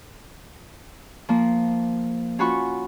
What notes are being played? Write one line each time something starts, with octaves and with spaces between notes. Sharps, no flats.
F3 A#3
C#4 F4 F#4 B5 C#6